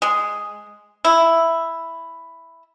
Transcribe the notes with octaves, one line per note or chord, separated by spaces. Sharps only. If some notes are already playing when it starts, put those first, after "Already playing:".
G#3
E4